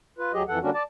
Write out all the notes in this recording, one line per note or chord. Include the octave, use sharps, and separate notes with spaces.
F4 B4
D2 F#3 G4 G#4 D#5
F2 E3 A4 F#5
D3 G3 A#3 C#4 D4 F#4
D5 A5